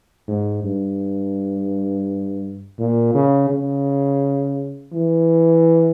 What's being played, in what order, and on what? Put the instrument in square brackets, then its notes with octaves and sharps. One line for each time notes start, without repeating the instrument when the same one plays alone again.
[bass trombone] G#2
G2
A#2
C#3
C#3
E3